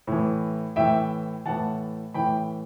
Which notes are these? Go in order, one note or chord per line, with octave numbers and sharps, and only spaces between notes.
A2 E3
A2 E3 E5 G5
A2 E3 F#5 A5
A2 E3 G5 B5